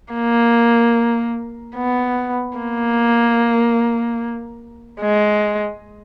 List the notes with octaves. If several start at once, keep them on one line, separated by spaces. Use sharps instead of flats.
A#3
B3
A#3
G#3